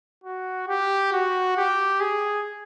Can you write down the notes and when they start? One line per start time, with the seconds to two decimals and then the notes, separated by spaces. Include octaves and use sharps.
0.24 F#4
0.68 G4
1.13 F#4
1.57 G4
2.01 G#4